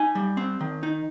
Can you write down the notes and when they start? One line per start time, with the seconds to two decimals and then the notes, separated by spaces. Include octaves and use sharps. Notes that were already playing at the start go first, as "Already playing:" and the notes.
Already playing: D#4 G#5
0.15 G3
0.37 C4
0.60 D#3
0.83 D#4